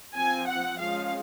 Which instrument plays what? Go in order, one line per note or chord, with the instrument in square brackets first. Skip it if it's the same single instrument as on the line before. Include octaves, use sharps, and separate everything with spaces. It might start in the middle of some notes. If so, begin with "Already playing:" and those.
[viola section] F3 C4 G#5
F#5
F3 G#3 C#4 F5